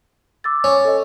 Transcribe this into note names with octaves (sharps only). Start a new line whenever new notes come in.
D6 E6 A6
C#4
A4 D#5